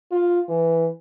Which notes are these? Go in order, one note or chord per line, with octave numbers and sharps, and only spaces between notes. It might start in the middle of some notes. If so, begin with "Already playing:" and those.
F4
E3